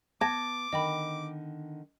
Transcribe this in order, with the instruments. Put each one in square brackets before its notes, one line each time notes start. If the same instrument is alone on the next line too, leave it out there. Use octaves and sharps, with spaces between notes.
[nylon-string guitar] B3 [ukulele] A5 [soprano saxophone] D6 [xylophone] G#6 A#6
[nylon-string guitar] D3 D#3 [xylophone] D#5 G5 B5